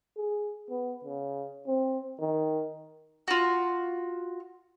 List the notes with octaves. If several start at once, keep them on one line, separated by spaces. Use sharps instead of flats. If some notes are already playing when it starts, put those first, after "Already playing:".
G#4
B3
C#3
C4
D#3
F4 F#4